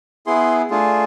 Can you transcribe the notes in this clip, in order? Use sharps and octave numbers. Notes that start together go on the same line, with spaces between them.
B3 E4 G#4 C6
A3 D4 F4 G#4